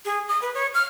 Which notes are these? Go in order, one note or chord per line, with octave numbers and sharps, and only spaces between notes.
G#4
D#6
B4
C#5
F6